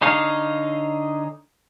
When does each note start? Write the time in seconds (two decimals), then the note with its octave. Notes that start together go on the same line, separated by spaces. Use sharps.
0.01 D3 D#4 G#4 C#5 F5